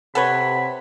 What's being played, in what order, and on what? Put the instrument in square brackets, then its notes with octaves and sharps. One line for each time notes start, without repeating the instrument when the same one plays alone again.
[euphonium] C3 [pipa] A4 B4 C#5 [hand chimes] F#5 [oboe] B5